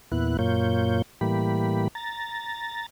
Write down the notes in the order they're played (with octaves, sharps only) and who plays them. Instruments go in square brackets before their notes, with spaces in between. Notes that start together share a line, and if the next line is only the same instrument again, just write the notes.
[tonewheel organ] E2 A#2 B3 E4 F#6
F#2 A#2 A#3 F4 C#5 G6
A2 E3 G3 A#3 G4 B5
A#5 A6